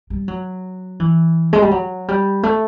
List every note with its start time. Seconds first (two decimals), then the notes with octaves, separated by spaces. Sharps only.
0.10 G3
0.28 F#3
1.00 E3
1.53 G#3
1.62 G3
1.71 F#3
2.08 G3
2.43 A3